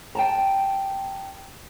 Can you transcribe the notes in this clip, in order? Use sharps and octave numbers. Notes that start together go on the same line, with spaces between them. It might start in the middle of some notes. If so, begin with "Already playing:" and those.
G5 A5 A#5